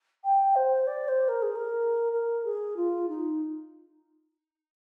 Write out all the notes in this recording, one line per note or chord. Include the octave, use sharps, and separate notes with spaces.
G5
C5
D5
C5
A#4
G#4
A#4
A#4
G#4
F4
D#4